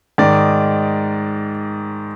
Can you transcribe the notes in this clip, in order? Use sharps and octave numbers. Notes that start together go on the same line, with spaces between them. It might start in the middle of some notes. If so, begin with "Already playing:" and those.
G#2 D#3 D5